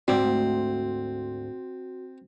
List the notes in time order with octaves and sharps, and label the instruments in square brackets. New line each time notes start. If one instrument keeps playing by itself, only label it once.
[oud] D2 G#2 D5 [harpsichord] C4 [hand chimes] F#4